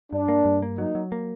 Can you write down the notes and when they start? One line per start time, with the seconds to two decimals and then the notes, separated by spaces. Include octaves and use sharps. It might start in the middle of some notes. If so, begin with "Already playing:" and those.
0.12 G2 D4
0.28 A#3
0.45 G2
0.62 A#3
0.78 F#3 D#4
0.95 F#3
1.12 A#3